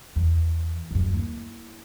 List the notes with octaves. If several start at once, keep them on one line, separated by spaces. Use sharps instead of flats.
E2
D1 F#2
A#3 E4